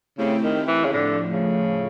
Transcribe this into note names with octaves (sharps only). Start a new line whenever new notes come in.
C#3 A3 C4 E4 G4
D#3
E3
C#3
A2 D3 F3 A3
C#3